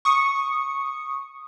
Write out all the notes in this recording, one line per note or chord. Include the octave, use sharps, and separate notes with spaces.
C#6 D#6 C#7